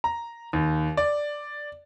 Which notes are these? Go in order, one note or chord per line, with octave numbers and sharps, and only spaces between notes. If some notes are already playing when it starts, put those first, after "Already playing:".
A#5
D#2
D5